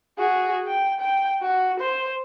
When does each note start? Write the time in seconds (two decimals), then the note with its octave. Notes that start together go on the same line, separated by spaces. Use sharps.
0.18 F#4 G#4
0.67 G5
1.00 G5
1.42 F#4
1.79 C5